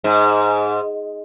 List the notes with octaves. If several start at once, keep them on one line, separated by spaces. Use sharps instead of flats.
G#2